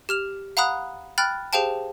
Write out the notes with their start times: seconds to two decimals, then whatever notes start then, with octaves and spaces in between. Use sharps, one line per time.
0.09 G4 F6 F7
0.57 F5 F#5 A#5 B5 D#6 F#6
1.18 G5 B5 F6 F#6 A6
1.53 G4 G#4 C5 F5 G5 A5